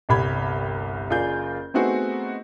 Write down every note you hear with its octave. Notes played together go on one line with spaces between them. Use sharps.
G1 C2 G4 B5 G#6
F#1 F4 G#4 A#4 D5 G6
A3 B3 C4 D#4 F#4 G#4